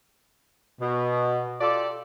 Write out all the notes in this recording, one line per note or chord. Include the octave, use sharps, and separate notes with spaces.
B2
F4 G4 A4 D5